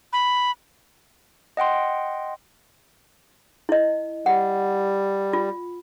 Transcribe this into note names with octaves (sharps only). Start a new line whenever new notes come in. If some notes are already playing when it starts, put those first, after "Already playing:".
B5
D#5 F#5 G5 C6
E4 D#5
G3 F#5
F4